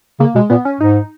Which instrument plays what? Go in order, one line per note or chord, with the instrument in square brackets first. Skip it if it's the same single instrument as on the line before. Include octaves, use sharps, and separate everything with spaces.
[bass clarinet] C#3 [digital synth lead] A#3
[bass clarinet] B2 [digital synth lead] G#3
[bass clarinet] A#2 [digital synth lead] B3
[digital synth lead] C#4
[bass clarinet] G#2 [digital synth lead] D#4